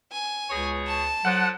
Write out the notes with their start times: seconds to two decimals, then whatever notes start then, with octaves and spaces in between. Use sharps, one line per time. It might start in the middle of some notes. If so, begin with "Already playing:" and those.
0.12 G#5
0.50 C#2 B2 G#4 C#5
0.87 A5
1.25 F3 F#3 A4 F#5